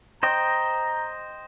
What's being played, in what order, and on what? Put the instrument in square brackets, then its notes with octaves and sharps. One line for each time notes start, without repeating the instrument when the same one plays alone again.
[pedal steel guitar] C5 D#5 G5 [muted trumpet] A#5